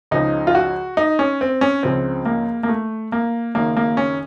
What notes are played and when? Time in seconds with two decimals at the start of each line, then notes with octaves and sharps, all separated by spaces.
0.11 C#2 C#3 F3 D#4
0.47 F4
0.55 F#4
0.97 D#4
1.19 C#4
1.41 C4
1.61 C#4
1.83 C#2 C#3 F3 C4
2.25 A#3
2.63 A#3
2.68 A3
3.12 A#3
3.55 F#1 F#2 D#3 A#3
3.77 A#3
3.97 C#4